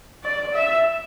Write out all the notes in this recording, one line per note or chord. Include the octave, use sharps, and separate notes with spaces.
D5
E5